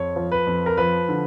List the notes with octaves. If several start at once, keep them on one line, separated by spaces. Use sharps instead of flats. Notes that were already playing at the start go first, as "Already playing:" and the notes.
Already playing: F2 C#5
F3
B4
F2
A#4
F3 B4
D3